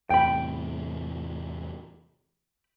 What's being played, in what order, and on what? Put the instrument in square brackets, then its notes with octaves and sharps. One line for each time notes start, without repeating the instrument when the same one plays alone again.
[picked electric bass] E2 A2 C3 [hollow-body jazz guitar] G5 B5